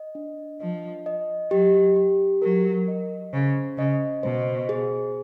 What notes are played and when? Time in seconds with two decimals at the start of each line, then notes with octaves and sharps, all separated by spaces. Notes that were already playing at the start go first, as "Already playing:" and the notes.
Already playing: D#5
0.15 D4
0.61 F3 D#5
1.06 D#5
1.51 F#3 G4
1.96 G4
2.42 F#3 A#4
2.88 D#5
3.33 C#3 C5
3.78 C#3 D#5
4.23 B2 C5
4.69 G#4